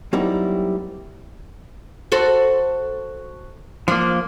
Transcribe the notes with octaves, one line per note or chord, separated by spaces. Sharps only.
F#3 G3 A#3 C4 D#4 E4
F#4 A4 C5
F3 A#3 D4